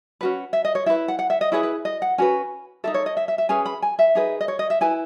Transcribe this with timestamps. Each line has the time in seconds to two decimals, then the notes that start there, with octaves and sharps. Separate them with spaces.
0.21 C#4 F#4 B4
0.53 E5
0.65 D#5
0.75 C#5
0.86 E4 E5
0.90 B4
1.08 F#5
1.19 F#5
1.30 E5
1.41 D#5
1.52 E4 G#4 B4 C#5
1.63 B4
1.85 D#5
2.02 F#5
2.18 C#4 F#4 B4 G#5
2.84 D#4 F#4 A4 E5
2.94 C#5
3.06 D#5
3.17 E5
3.28 E5
3.38 E5
3.49 C#4 G#4 B4 G#5
3.66 B5
3.82 G#5
3.99 E5
4.15 D#4 G#4 B4
4.41 D#5
4.48 C#5
4.59 D#5
4.70 E5
4.81 E4 B4 G#5